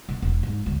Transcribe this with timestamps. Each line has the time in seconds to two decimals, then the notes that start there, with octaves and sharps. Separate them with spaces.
0.09 B2
0.22 E1
0.43 G#2
0.66 D2